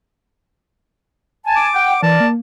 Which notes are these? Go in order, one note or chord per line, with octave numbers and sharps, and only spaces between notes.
G#5 A5
D6
F#5 G5
E3 A#4 D5 A5
A#3